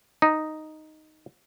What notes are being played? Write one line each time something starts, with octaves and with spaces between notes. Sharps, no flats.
D#4